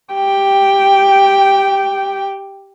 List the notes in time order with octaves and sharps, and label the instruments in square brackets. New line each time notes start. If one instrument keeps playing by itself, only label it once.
[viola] G4 G5